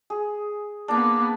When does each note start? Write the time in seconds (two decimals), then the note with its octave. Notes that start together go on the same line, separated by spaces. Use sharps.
0.10 G#4
0.88 A#3 B3 D4 A5 D6